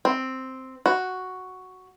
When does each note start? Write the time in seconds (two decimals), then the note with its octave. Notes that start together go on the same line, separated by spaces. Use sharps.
0.05 C4
0.86 F#4